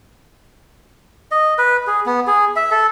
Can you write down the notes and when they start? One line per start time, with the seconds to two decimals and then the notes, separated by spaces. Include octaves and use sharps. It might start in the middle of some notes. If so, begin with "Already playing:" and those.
1.31 D#5
1.58 B4
1.87 G#4
2.06 B3
2.27 G#4
2.56 E5
2.71 A4